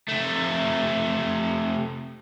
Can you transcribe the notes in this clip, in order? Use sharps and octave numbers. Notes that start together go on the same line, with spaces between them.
C3 A3